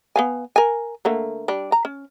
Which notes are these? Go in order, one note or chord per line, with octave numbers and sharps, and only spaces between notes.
B3 F5 G#5
A#4 G#5
D3 A3 A#3
G3 D4
A#5
C#4